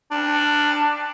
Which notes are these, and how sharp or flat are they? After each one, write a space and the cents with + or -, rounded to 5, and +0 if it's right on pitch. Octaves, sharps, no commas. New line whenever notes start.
D4 +10